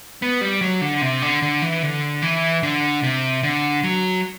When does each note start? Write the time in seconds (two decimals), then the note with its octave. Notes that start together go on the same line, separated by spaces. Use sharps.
0.22 B3
0.41 G3
0.61 F#3
0.81 D3
1.01 C3
1.22 D3
1.42 D3
1.62 E3
1.83 D3
2.22 E3
2.63 D3
3.03 C3
3.43 D3
3.84 F#3